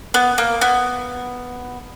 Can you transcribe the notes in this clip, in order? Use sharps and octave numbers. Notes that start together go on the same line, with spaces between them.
B3
A#3
B3